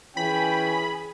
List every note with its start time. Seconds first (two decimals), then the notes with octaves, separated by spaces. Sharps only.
0.17 E3 C#4 G#4 G5 B5